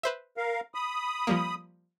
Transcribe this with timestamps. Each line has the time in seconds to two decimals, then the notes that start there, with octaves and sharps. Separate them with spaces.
0.03 B4 C5 E5
0.37 A#4 F5
0.74 B5 D#6
1.27 F3 G3 A#3